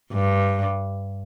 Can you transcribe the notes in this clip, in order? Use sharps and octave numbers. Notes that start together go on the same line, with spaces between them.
G2